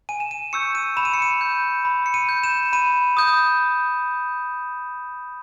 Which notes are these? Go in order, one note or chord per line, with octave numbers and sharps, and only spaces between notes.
G#5 D#7
E7
D#7
C#6 E6 G6 C#7
D#7
B5 E7
D#7
C#7
D#7
G6
B5
C#7
D#7
G6
E7
B5 D#7
D#6 G6